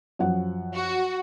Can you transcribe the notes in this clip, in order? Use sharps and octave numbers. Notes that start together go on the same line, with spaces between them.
F#2 F3 F#5
F#4